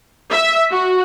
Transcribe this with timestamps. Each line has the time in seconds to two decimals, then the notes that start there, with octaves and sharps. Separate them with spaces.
0.31 E5
0.71 F#4